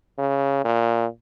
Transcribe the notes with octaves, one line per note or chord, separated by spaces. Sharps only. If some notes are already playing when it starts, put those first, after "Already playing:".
C#3
A#2